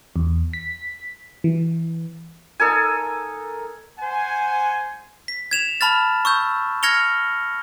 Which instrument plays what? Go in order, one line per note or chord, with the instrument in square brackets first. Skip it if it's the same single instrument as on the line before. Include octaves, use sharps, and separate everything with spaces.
[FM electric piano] E2
B6
E3
[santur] D#4 A4 A#4 G#5
[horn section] C5 F#5 G#5
[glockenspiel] B6
G#6 E7 F7
A5 B5 F6 A6
C#6 E6 G6
F6 G#6 A#6 C#7 F7 G7